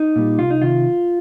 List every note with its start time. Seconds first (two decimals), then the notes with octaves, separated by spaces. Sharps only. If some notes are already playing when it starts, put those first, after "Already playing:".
Already playing: D#4
0.16 A#2 G3
0.38 C2 F4
0.51 D#4
0.62 C3 D#3 F4